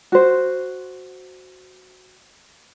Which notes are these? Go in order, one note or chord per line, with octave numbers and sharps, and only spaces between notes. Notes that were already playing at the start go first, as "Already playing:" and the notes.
F#4 C5